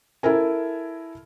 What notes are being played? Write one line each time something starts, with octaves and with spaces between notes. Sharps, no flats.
E4 A4 A#4 G#5